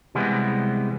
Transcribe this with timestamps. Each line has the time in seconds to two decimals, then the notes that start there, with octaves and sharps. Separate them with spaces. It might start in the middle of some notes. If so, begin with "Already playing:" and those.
0.15 C3 E3 G3 G#3 B3